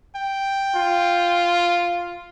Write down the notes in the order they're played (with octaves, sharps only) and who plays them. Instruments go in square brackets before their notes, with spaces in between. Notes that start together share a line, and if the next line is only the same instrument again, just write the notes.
[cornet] G5
[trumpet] F4